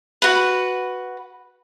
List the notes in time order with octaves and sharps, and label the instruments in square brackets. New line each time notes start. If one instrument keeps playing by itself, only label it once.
[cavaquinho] F#4 B4